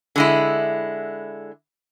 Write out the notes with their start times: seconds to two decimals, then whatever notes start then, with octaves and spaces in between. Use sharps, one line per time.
0.16 D3 G#3 E4